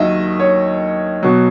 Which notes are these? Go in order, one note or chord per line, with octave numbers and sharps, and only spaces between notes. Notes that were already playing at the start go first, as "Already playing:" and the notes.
Already playing: D#2 D#3 F#3 D#5 E5
C#5
B2 F#3